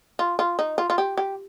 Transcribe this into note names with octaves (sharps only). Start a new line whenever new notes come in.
F4
F4
D#4
F4
F4
G4
G4